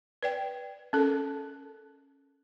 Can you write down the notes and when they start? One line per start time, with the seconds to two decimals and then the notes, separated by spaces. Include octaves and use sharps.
0.23 B4 D5 G5
0.93 C#4 A4 A#4